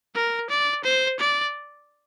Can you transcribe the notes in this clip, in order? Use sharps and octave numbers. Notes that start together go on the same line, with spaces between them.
A#4
D5
C5
D5